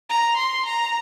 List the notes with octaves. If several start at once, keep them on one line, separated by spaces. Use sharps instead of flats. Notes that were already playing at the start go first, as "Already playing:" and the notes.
A#5
C6
A#5